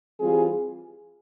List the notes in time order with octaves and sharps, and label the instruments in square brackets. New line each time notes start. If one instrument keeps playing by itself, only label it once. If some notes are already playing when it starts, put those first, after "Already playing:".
[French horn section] E3 G3 C4 F4 G#4